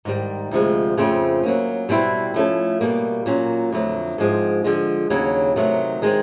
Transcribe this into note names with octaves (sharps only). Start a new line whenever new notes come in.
G#2 D#3 G3
D2 C3 F3 G#3
F2 C#3 F3 A3 C4
F#3 A#3 C#4
B2 G3 C4 E4
F3 A3 C#4 E4 A4
B2 G3 A#3
A#2 F#3 A#3 C#4
F2 D3 F#3 A3
G#2 F3 G#3 C4
D3 F3 G#3
D#2 C#3 F#3
C3 D#3 F#3 A3
D#3 G#3 C4